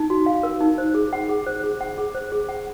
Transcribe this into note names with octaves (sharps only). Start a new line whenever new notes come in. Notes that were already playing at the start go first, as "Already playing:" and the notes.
Already playing: D#4
F#4
F5
A#4
D#4
C5
G#4
F#5
G#4
C5
G#4
F#5
G#4
C5
G#4
F#5